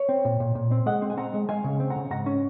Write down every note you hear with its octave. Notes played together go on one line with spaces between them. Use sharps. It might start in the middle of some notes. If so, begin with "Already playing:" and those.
Already playing: C#5
C4
A#2
A#2
A#2
C4
G#3 D#5 F#5
C4
G#5
C4 F#5 A#5
G#3
G#3 F5 G#5
C#3
C4
F#5 A#5
C#3
G#2 F#5 A#5
C#4